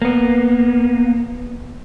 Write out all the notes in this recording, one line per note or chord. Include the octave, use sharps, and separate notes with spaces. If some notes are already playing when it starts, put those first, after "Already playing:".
A#3 B3